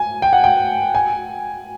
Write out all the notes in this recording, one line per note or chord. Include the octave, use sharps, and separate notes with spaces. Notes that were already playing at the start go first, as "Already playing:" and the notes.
Already playing: G#5
G5
F#5
G5
G#5